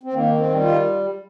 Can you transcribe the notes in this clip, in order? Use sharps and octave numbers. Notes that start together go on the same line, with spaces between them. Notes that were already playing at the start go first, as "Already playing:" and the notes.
C4
D#3 A#3
C4
G3
F4